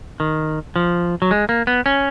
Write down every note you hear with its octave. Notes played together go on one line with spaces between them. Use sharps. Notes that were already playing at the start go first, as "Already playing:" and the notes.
D#3
F3
F#3
G#3
A#3
B3
C#4